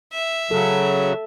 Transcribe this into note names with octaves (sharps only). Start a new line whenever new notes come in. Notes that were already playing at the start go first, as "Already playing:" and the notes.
E5
C#3 F#3 A4